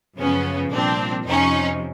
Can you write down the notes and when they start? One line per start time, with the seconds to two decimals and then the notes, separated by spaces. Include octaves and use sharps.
0.18 F#2 C#3 F3 B3 C#4
0.72 C2 A#2 F3 C4 D4
1.27 F2 C3 F3 C#4 D#4